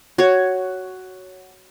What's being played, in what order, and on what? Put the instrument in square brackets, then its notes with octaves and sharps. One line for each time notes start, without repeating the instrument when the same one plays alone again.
[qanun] F#4 C#5